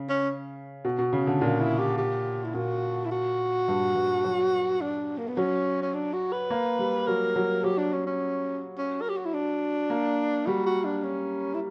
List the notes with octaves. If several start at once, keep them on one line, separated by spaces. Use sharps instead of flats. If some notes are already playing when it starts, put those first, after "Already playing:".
Already playing: C#3
C#4
B2
B2
C#3
D3
A#2 D4
E4
G4
G4
E4
A#2 F#4
E4
F#4
G2
G2
F#3
D4
A#3
B3
F#3 C#4
C#4
D4
F#4
B4
A#3
G3
F#3 A#4
F#3
F#3 G4
D4
C#4
C#4
C#4
A#4
G4
F#4
E4
D4
A#3
G3 F#4
F#4
D4
C#4
E4